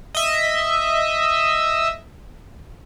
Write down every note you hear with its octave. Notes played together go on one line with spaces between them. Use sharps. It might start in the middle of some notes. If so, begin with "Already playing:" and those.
D#5 E5